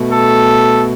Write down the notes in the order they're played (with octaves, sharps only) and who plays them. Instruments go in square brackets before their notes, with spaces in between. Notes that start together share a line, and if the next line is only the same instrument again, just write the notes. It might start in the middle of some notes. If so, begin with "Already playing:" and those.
Already playing: [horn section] B2 A3
A4